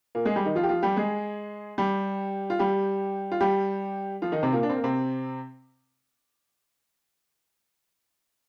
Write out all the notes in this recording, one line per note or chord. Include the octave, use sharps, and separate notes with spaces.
A#2 A#3
G#3 G#4
G3 G4
D#3 D#4
F3 F4
G4
F3 F4
G3 G4
G#3 G#4
G3 G4
F4
G3 G4
F4
G3 G4
F3 F4
D#3 D#4
C3 C4
A#2 A#3
D4
C4
A#3
C3 C4